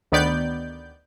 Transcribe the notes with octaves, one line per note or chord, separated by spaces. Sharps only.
D2 D#3 B3 D5 G6